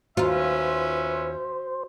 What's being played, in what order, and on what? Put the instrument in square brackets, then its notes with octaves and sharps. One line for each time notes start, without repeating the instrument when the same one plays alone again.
[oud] D#2 F4 [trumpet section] C#4 B4 E5 [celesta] F#4 [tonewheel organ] C5